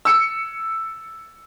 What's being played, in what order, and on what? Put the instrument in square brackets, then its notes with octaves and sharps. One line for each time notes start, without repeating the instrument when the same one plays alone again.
[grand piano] E6 C#7